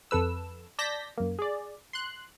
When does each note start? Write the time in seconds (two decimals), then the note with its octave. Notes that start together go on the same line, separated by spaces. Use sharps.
0.11 F2 A4 B4 E6
0.79 D5 A5 G6 A#6 B6
1.18 F#2 A#3
1.39 G#4 D5
1.93 C6 F#6